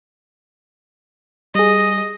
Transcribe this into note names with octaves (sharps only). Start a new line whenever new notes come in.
G3 G#4 D#5